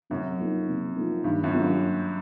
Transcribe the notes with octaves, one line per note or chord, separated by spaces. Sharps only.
F#2 C3
F3 A#3 D#4
C3
F3 A#3 D#4
G2 D#3
F#2
F#3 A#3 C#4 F4
G2